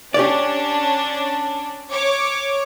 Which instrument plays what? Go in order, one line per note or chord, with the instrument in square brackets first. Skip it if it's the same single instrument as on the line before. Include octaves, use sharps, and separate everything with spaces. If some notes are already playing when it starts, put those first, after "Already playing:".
[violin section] C#4 D4 [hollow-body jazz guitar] G4 C#5 D5
[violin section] C#5 D6